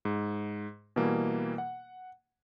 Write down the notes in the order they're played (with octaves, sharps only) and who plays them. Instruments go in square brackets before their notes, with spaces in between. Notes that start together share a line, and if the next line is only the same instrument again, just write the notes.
[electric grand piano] G#2
B2 E3 G3 A#3
F#5